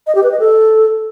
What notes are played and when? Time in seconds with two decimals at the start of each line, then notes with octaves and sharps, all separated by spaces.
0.07 D#5
0.15 G4
0.23 B4
0.31 D#5
0.40 A4